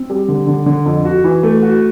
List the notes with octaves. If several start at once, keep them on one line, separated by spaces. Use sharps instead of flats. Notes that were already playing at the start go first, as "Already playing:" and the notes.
Already playing: C4
G3
D3
D3
D3
F2
F#4
E3
A3
F#4